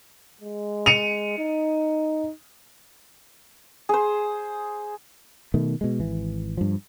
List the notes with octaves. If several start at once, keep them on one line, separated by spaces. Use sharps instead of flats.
G#3
C#7 D#7 F7
D#4
G#4 C5
B2 D#3 A3
B2 G#3
G#1 E3
G2 F3